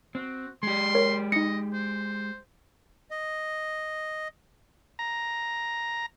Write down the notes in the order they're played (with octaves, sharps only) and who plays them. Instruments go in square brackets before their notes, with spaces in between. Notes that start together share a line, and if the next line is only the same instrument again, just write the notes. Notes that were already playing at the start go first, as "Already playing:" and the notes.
[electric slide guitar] C4 [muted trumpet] F#4
[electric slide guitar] G#3 G4 [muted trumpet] C6
[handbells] A#4 C#5
[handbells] D#4 C#7 [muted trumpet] D#5
[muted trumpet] C5
[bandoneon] D#5
[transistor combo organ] A#5